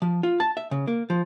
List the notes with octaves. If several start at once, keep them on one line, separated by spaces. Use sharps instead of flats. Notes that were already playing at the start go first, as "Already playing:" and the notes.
F3
F4
A5
E5
C#3
A#3
F3